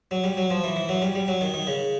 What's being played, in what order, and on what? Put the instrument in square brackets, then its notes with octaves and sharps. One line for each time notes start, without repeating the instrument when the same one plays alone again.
[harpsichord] F#3
G3
F#3
F3
E3
E3
F#3
G3
G3
F#3
D#3
D#3
C#3